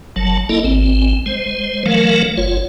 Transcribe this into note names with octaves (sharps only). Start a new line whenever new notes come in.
F#1 F#3 A5
A#3 E4 A4 D#5
G#1 C4
G#3 C5
E3 F#3 A3 A#4 F5
F#1 F4 C#5